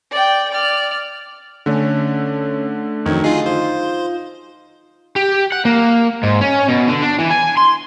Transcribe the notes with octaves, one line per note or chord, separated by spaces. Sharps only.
D5 G5
D5 F6
D3 A3 C#4
F2 D#3 F#3 G#6
D#4 F4 G#4 C7
F4 C5
G4
F#5
A#3
G#2
C#4
B2
D3
D4
E3
G#5
C6